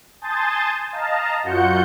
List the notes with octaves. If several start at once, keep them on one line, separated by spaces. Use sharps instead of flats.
G#5 A5 C6 D#6 G6 A6
D#5 F5 A5 A#5
F#2 F4 F#4 F#5 G6 C#7